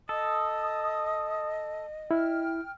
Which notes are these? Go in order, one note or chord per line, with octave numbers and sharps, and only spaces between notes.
A4 D#5 D#6
E4 G5 F6